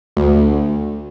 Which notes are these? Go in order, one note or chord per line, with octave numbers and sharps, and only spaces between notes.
D2